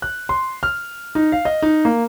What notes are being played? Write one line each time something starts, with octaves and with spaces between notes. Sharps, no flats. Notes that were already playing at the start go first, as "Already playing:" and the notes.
F#6
C6
F6
D#4
F5
D#5
D#4
A#3